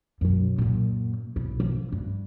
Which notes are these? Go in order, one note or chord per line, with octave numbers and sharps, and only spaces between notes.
B1 F#2
F#2 A#2
B1 E4
F3
G2